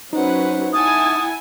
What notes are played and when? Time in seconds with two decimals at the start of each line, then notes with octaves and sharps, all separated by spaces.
0.13 F#3 C#4 D#4 B4 C5 F#5
0.73 E4 F#5 G#5 A5 D#6